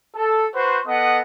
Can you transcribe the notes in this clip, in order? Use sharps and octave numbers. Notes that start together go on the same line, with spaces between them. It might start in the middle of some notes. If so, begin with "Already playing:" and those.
A4
F#4 B4 C5
B3 A4 D#5 F#5 D#6